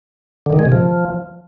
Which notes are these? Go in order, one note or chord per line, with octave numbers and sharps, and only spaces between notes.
D3
D#3
G#3
C3
F3